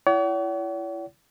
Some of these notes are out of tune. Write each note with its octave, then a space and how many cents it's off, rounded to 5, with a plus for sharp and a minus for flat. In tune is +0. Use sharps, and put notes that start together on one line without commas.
E4 +30 C#5 +45 F#5 +40